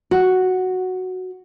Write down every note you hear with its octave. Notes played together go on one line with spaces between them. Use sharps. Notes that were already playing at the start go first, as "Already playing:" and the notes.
F#4